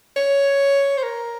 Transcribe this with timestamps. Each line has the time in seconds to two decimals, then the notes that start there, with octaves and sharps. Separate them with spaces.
0.17 C#5
0.97 C5
1.03 A#4